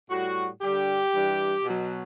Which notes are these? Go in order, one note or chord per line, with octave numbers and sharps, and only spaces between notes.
A2 G3 F#4
G2 D3 G3 G4
G2 E3 G3
B2 F#3